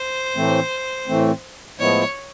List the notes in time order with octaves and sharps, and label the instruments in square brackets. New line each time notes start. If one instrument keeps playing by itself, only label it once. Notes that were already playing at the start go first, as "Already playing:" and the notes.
Already playing: [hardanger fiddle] C5
[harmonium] A2 E3 A3 C4
A2 E3 A3 C4
[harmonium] A2 F3 G#3 B3 E4 [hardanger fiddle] C#5